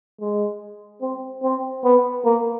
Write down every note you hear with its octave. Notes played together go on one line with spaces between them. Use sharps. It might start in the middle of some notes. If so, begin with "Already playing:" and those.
G#3
C4
C4
B3
A#3